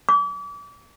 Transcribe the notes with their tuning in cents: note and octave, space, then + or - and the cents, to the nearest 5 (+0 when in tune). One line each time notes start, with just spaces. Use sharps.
D6 -35